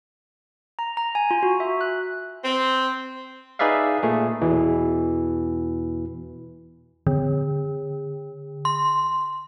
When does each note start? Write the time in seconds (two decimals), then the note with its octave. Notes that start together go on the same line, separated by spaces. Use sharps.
0.79 A#5
0.97 A#5
1.15 G#5
1.31 F4
1.43 F#4
1.60 E5
1.81 F#6
2.43 C4
3.59 D#4 G#4 B4 D5 E5 F5
4.03 A#2 A3 G#4
4.41 E2 B2 E3
7.07 D3
8.65 C6